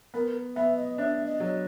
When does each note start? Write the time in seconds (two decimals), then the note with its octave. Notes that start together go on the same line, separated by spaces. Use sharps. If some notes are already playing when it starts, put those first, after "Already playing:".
0.14 B3 A#4
0.56 B3 E5
0.77 D#5
0.98 D4 E5
1.26 D#5
1.40 F#3 D#5